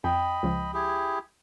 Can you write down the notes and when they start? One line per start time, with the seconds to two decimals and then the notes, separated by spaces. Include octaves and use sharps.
0.04 F2 D#5 G5 B5
0.43 C#2 F3
0.74 E4 G4 G#4